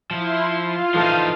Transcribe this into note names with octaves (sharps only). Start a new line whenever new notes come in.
F3 E4 C6
F4 F5
E3 F3 D#4 A4 A5